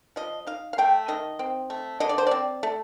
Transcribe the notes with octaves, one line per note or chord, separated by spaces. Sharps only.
F3 D#5
D#4 F5
F5
A3 G5
D#3 D#5
C4
A3
D3 D#5
D5
C5
C4 D5
A3